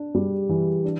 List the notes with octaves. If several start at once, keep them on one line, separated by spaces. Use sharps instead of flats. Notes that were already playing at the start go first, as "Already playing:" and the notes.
Already playing: D4
G3
E3
D4